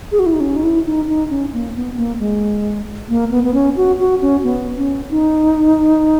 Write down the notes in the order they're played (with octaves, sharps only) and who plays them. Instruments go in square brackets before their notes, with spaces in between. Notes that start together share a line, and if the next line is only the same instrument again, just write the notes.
[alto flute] G#4
F#4
E4
D#4
C#4
D#4
E4
D#4
D#4
C#4
A#3
B3
A#3
G#3
A#3
B3
B3
C#4
F#4
F#4
C#4
B3
C#4
D#4